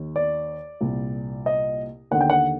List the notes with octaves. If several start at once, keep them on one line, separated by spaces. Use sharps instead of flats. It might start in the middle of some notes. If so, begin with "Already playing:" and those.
Already playing: D#2 D#3
D5
C2 A#2
D#5
D#2 D3 F#5
G5
F#5